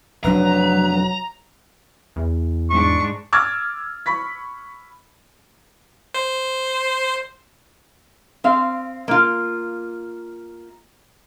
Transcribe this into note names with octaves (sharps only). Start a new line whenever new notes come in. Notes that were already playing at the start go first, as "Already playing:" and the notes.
F1 F#3 D4 B4 A#5
E2
G#2 D4 C#6
D6 E6 F6 G#6 A6
B5 C#6 B6
C5
C4 F5
A#3 F4